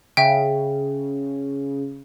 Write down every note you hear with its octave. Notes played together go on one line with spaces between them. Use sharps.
C#3 E5 G5